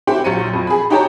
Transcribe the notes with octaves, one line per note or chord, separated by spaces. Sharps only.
C4 E4 F#4 G4 C5
A#1 F#3 C#7 D#7
F2
G#4 B5
D#4 F#4 G4 C#5 A5 A#5